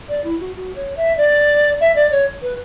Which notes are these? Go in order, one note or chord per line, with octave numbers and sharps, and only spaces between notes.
D5
E4
F#4
F#4
C#5
E5
D5
E5
D5
C#5
B4